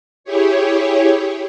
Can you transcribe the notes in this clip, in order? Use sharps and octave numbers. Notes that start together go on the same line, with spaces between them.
E4 G4 G#4 C#5